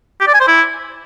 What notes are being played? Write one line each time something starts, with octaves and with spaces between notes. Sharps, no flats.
G4
D5
G#5
C5
E4